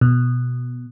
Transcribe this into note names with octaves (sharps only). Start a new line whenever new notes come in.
B2